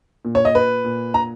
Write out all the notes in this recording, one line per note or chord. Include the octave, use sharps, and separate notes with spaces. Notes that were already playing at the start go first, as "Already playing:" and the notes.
A#2
C#5
D#5
B4
A#2
A#5